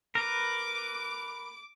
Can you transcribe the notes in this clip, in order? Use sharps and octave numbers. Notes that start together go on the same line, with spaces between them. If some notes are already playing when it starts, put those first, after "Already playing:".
A#4 B4 D6